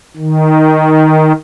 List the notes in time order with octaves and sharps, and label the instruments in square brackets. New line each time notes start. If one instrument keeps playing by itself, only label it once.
[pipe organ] D#3